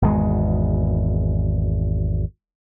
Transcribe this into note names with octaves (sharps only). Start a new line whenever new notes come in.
G#1 E2 B2 G#3